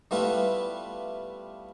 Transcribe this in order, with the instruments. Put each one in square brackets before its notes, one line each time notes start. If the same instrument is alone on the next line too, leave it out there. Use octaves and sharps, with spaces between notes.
[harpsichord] G3 A3 B3 E4 F4 B4